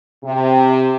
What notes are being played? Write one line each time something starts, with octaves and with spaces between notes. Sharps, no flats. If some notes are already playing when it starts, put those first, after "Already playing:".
C3